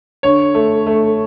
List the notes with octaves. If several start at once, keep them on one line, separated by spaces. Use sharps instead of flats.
D3 C#5
A3
A3